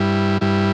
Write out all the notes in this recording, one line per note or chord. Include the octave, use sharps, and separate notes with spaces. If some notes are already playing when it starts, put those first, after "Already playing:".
Already playing: G2 G3 E4
G2 G3 E4